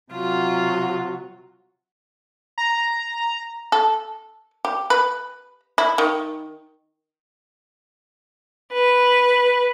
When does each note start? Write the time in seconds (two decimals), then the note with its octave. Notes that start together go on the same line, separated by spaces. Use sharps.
0.12 C3 F#3 F4 F#4
2.58 A#5
3.72 A4
4.65 G4
4.90 B4
5.78 E4
5.98 D#3
8.74 B4